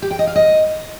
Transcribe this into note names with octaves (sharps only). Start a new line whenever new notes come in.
G4
G5
D#5
F5
D#5